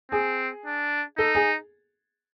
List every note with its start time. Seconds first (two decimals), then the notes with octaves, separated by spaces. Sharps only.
0.11 C4 G#4
0.65 D4
1.18 D#4 A4
1.35 G#4